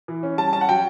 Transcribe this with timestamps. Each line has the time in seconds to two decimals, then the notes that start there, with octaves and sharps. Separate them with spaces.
0.08 E3
0.23 C#4
0.38 G3 A5
0.53 C#4 A5
0.61 F#5
0.69 F#3 G5